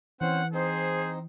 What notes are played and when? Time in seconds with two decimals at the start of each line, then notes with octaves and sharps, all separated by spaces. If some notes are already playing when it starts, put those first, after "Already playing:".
0.21 E3 C4 C#4 C5 F#5
0.53 C4 D#4 G#4 C5